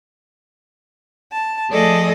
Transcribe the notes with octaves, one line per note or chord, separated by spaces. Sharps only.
A5
F3 A3 G#4 A4 D5 D#5